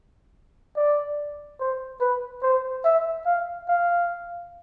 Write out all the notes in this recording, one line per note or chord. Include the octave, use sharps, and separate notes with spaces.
D5
C5
B4
C5
E5
F5
F5